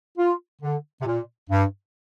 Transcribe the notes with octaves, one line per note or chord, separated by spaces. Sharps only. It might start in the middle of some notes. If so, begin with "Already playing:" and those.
F4
D3
C3
A#2
G2